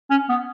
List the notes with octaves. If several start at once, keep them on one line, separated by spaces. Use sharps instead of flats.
C#4
B3